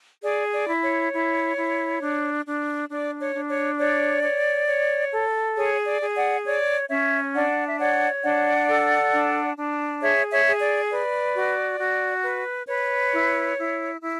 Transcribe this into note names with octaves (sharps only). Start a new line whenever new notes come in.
G#4 D5
D5
E4
C#5
E4
E4
D4
D4
D4 D5
C#5
D4
C#5
C#5 D5
C#5
C#5
A4
G#4 C#5
D5
G#4
D5 F#5
C#5 D5
C#4 C#5 E5
D4 D5 F#5
E5
C#5 D5 F#5
D4 D5 F#5
A4
D4
D4
G#4 C#5 E5
C#5 E5
G#4
D5
B4 D5
F#4
F#4
B4
B4 C#5
E4
E4
E4